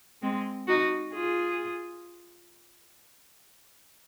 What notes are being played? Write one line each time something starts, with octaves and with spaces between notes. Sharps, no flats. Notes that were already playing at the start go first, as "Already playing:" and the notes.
G#3 C4
D#4 F#4
F4 G#4